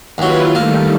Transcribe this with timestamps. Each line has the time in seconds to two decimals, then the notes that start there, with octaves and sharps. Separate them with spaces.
0.18 D#2 F#3 E4 F4 B4
0.55 D#3 G3 A3 A#3